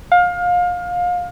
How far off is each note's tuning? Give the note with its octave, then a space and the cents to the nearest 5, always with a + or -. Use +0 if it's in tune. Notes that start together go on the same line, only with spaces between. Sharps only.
F5 +25